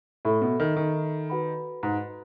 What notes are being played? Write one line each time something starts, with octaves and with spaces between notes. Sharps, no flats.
A2 A4 E5 B5
B2
D#3
D#3
F#4 B4 F#5 B5
G#2